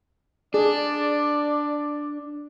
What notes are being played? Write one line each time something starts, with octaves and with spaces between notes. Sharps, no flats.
D4 G#4 D5